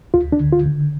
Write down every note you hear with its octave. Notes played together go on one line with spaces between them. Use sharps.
D2 F4
D4
D3
F4
D3